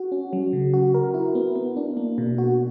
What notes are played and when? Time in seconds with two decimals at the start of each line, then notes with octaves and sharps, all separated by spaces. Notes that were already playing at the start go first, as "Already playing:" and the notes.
Already playing: F#4
0.12 C#4
0.33 F#3
0.53 C#3
0.74 F#4
0.94 A#4
1.14 E4
1.35 B3
1.56 B3
1.77 D4
1.97 A#3
2.18 B2
2.38 F#4